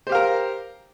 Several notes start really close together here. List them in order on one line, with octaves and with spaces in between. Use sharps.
C5 G4 F5 A#4